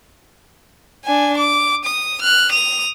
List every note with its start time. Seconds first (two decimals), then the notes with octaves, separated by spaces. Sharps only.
1.05 D4 G#5
1.38 D6
1.85 D#6
2.22 F6 F#6
2.51 D#6 F7